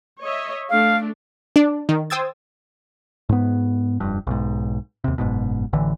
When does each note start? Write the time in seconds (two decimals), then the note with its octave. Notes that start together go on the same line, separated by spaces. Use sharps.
0.21 C#5 D#5 E5
0.69 A3 D4 F5
1.56 D4 D5
1.89 D#3
2.10 C5 G5 D#6 E6 G#6 A6
3.29 G#2 B3
4.00 F1 G2
4.27 B1 G#2
5.04 D#2 C3
5.18 F#1 G#2 B2
5.73 A1 D3 E3